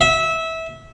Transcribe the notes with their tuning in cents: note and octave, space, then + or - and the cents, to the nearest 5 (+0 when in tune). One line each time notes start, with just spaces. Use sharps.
E5 -20